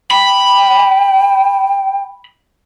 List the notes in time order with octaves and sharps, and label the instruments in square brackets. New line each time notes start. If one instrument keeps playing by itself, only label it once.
[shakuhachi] G5 [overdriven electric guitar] B5